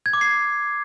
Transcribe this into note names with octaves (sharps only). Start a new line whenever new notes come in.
G#6
D6
C7